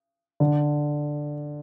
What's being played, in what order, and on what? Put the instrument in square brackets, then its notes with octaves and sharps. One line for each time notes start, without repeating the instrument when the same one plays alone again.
[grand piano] D3